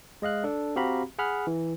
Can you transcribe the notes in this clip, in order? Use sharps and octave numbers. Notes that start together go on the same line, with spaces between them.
G#3 D#5 F5 F#6
D4 A4
C4 F#4 G4 F5 A#5 B5
G#4 F#5 B5 F6
E3